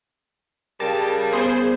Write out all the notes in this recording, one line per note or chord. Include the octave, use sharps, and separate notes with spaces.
C#3 G3 A#4 A5
B3 G#4 C5